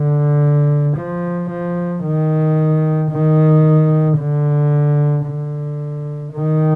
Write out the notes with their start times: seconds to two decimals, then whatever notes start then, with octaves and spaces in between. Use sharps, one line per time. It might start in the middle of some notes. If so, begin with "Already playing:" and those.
Already playing: D3
0.97 F3
1.50 F3
2.04 D#3
3.11 D#3
4.19 D3
5.26 D3
6.33 D#3